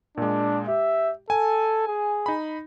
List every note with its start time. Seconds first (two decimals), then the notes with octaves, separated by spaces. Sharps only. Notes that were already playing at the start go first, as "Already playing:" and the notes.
0.17 A#2 G#3 D4
0.68 G4 E5
1.30 A4 G#5
1.88 G#4
2.26 D#4 B5